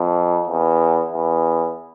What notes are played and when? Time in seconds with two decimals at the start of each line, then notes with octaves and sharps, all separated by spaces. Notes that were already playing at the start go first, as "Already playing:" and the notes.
Already playing: F2
0.48 E2
1.12 E2